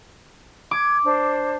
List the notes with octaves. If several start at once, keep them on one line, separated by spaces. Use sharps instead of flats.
D6 G#6
D4 C5